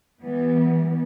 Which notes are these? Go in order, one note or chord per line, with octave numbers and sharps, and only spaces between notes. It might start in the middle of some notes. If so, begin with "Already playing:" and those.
E3 G3 B3